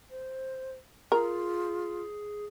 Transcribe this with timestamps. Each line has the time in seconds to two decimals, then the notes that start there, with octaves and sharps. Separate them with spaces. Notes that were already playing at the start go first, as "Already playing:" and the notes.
0.11 C5
1.12 F4 G#4 A#4